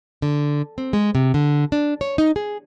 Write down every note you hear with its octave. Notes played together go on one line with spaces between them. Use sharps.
D3
C4
G#3
C3
D3
D4
C#5
D#4
G#4